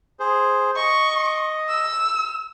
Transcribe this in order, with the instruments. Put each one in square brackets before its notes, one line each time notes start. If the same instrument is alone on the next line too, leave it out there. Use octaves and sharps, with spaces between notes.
[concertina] G#4 C5
[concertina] D#5 [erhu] C#6
[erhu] E6